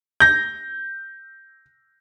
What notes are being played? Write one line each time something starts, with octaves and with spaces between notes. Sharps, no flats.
G6 A#6